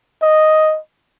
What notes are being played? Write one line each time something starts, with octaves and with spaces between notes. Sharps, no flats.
D#5